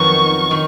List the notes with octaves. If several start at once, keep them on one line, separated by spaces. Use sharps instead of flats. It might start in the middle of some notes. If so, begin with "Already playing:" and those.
Already playing: F2 D#3 F#3 B3 D#4 C#6
D#3